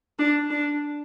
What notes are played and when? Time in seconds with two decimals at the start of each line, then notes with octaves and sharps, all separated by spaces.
0.19 D4
0.51 D4